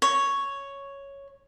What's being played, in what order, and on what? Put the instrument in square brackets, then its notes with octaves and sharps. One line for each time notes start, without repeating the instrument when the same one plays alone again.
[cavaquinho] C#5